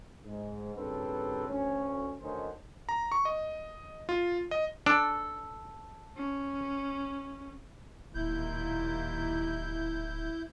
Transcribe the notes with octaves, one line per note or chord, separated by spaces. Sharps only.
G#2
G2 A#2 C#3 C4 A4 B4
D2 C#4
D2 D3 D#3 C#4 D#4 C5
A#5
C#6
D#5
F4
D#5
D4 A4
C#4
D1 D#2 A#2 E4 G6